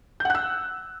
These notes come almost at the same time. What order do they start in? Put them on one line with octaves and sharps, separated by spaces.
G6 F#5 F#6 E6